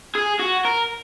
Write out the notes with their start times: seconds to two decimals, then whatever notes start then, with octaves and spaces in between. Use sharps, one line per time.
0.15 G#4
0.39 F#4
0.65 A#4